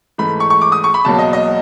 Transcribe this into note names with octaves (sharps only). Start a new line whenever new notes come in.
G#2 E3 A3 B5
C#6
C#6
D6
D#6
C#6
B5
E2 B2 F#3 A#3 A5
D#5
D#5